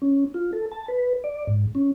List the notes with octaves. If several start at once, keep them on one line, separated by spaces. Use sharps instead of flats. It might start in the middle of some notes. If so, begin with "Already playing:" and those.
C#4
F4
A4
A5
B4
D5
G#2
C#4